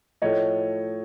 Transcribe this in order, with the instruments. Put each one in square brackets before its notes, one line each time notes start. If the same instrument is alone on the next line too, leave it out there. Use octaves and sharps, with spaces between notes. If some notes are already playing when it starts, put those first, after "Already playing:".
[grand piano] A2 F3 A3 C#5 D#5